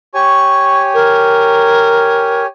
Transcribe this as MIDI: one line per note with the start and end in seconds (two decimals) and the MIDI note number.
0.14 2.47 67
0.14 2.47 73
0.14 2.47 80
0.14 0.83 85
0.94 2.44 70